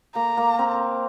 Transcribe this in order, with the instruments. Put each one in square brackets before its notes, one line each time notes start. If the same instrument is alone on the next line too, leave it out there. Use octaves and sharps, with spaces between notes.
[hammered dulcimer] A#3 [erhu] A#5
[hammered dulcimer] A#3
C4